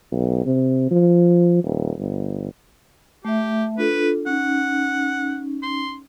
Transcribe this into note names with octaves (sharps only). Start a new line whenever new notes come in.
B1
C3
F3
D#1
G1
A3 G4 E5
D4 F4 A4 B4
C#4 D#4 F#5
C6